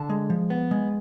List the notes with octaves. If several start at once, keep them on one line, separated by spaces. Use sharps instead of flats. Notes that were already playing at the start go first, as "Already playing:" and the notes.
Already playing: D3 A5
G#3
F3
B3
G#3